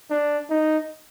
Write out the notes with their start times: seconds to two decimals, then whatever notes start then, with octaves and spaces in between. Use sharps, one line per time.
0.10 D4
0.50 D#4